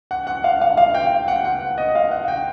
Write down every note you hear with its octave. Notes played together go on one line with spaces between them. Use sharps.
F#5
F#5
F5
F5
F5
G5
F#5
F#5
D#5
F5
F#5
G5